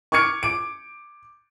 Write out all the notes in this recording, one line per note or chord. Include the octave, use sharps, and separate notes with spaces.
C#6 D6 F6 G#6 C#7 D7
D6 D7